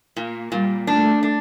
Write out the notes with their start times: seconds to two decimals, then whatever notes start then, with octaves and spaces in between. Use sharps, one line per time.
0.16 A#2 A#3
0.52 A#2 G3
0.87 A3 D4
1.23 D4